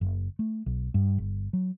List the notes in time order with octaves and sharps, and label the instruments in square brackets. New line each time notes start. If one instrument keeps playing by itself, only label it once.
[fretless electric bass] F#1
A3
B1
G2
G1
F#3